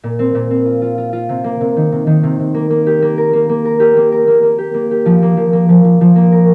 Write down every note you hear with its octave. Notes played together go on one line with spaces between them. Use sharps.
A#2
C4
A#2
C4
F4
F4
F4
F4
C3
A#3
C3
D#3
C3
D#3
C3
C3
A#3
A#3
G4
A#3
A#4
A#3
A#3
A#4
G4
A#3
A#4
A#3
A#3
G4
A#3
G4
F3
A#3
F3
A#3
F3
F3
F3
A#3
A#4